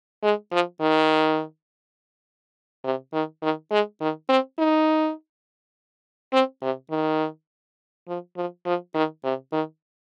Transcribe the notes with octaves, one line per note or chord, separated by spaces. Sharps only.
G#3
F3
D#3
C3
D#3
D#3
G#3
D#3
C4
D#4
C4
C3
D#3
F3
F3
F3
D#3
C3
D#3